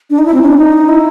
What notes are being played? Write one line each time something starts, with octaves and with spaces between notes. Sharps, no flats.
D4
D#4
E4
C4
C#4
D4
D#4
E4